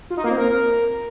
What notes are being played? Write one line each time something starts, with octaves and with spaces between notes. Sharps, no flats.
F4
D#4
A#3
C4
A#4